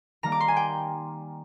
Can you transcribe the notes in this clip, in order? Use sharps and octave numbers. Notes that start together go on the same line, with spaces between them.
D#3 G3 A#3 A#5
D6
C6
G#5
G5